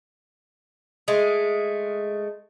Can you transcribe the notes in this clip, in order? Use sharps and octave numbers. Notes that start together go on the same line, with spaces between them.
G#3 A3